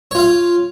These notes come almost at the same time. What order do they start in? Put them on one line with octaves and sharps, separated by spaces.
C#5 F4 F5